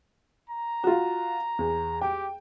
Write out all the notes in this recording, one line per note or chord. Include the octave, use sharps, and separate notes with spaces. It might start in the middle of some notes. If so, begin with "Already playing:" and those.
A#5
F4 F#4
E2
G4 G5